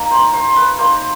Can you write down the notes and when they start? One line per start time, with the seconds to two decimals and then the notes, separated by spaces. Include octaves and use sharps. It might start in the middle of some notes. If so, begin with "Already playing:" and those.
Already playing: A#3 D#4
0.11 C5
0.33 C5
0.56 B4
0.78 A#3 D#4 C5